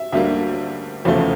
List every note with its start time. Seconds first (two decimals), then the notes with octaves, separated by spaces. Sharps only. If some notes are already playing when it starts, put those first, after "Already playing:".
Already playing: E5
0.12 D2 D3 G3 A#3 E5
1.05 F1 E2 C#3 F3 A3